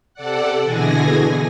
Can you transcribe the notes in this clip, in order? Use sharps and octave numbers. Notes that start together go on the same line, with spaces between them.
C3 A4 D5 F#5
B2 D3 E3 G#4 G#5 A#6